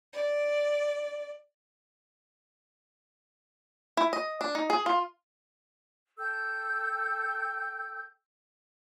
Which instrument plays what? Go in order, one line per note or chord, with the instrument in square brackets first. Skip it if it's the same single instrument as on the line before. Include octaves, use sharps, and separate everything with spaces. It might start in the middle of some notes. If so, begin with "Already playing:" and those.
[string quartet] D5
[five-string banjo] E4
D#5
D4
D#4
G#4
F4
[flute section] A4 G5 E6 G6